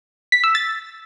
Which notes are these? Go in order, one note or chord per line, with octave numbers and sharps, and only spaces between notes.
B6
E6
A6